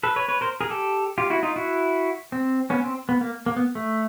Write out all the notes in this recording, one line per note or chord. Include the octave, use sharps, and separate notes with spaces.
A4 B4
B4 C#5
B4 C#5
A#4 C5
G#4 A#4
G4 A4
F4 G4
E4 F#4
D#4 F4
E4 F#4
C4
B3 C#4
C4
B3
A#3
A#3
B3
A3